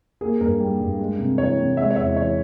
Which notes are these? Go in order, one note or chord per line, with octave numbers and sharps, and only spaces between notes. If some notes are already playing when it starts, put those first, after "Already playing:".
A#3 G#4
G2 A#4
G3
G2
G#3
C3
E3 C#5
C3
G#3 E5
C#5
E2 E5
E3 C#5